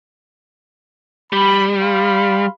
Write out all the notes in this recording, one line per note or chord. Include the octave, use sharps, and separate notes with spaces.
G3 B5
F5 B5 C6